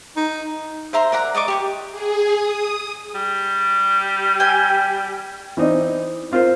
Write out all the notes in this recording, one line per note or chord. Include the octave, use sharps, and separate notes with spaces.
D#4
C5 E5 A#5 C6
A#4 D5 F#5 A#5
D5 D#5 C#6 D6
G4 C#6 D6
G#4
D#6
G3
G5 G#5
E3 C4 D#4 D5
C4 F4 A#4 C5